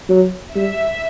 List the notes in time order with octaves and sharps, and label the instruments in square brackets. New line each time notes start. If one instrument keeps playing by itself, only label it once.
[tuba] F#3
[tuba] G3 [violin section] E5